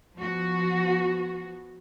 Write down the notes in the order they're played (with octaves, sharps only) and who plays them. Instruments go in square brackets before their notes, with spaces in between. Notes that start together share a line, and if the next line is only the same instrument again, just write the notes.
[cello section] F3 B3 F#4